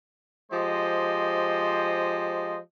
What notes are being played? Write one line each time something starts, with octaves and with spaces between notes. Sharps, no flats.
F3 G#3 G4 C5 D#5